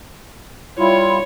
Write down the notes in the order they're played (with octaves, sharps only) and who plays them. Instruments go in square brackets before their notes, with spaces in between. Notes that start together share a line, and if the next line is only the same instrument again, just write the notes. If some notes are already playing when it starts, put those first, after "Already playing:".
[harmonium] G3 E4 F4 [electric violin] C#5